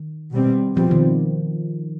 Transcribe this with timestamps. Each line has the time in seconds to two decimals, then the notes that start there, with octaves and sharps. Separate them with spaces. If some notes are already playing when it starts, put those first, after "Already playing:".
Already playing: D#3
0.32 B2 G3 C4
0.77 B2 F3 G3 C4
0.91 D#3